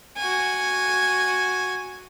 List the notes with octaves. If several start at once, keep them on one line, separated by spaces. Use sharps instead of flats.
F#4 G#5